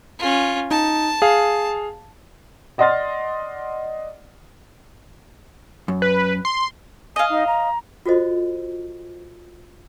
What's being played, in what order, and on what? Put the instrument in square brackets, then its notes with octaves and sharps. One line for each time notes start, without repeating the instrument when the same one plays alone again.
[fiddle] C#4 F4
[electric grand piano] D#4 [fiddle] A5
[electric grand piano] G#4 F5
[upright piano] D5 D#5 F#5 C6 F6 A6
[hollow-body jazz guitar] F#2
[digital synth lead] B4
C6
[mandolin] D#5 F5 [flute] G#5
[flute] D#4
A#5
[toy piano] F4 F#4 A4 C5 D#5